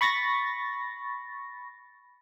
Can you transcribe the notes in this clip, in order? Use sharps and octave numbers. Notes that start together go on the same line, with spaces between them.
B5 C#6 A6 A#6